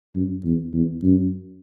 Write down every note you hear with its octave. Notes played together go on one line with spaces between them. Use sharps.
F#2
E2
E2
F#2